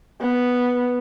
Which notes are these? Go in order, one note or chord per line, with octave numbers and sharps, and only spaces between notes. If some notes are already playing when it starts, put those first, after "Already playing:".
B3